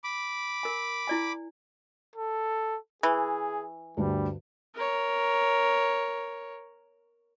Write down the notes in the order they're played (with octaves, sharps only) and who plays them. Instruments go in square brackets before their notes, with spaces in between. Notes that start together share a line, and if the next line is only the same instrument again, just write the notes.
[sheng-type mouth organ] B5 D6
[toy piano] A#4 G#5
E4 D5 G#5
[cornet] A4
[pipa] E3 [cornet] G#4
[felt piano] D2 G2 D3 [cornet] G3
[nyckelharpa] A#4 C#5